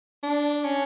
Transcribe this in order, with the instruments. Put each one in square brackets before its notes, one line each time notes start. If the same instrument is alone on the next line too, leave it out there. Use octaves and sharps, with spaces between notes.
[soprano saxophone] D4
C#4